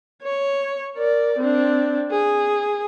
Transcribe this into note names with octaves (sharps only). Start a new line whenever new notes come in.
C#5
A#4 D5
C4 D4
G#4